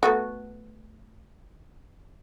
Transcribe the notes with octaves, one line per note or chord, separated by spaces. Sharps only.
A3 B3 F#4